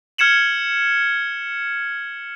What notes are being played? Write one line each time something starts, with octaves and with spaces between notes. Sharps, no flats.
F6 G#6 C#7 E7 F#7